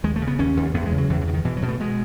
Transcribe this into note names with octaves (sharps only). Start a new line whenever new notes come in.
D#2 G#3
A3
C#3
B3
D#2 C#4
D#2
E2 B3
A3
G#3
C#3
F#3
E2 E3
E3
C#3
D#3
B2 E3
F#3
B2
A3
B2 G#3